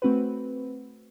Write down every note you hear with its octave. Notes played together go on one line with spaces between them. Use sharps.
A3 C4 F#4 B4